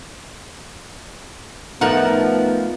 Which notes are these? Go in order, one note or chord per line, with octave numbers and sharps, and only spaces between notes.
F3 A3 B3 D#4 A#4 F#5